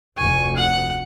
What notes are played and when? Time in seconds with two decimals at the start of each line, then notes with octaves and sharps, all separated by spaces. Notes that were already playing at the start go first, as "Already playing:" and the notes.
0.17 F1 D2 G#5 C#6
0.56 F#5